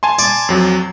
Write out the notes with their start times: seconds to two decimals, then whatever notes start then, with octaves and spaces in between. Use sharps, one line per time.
0.03 G#5 A5 C6
0.19 D5
0.49 F2 F#3